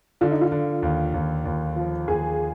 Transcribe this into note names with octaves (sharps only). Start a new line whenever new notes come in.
D3 F4
D#4
F4
D3
D#2
D#2
D#2
F3
D#2 G#4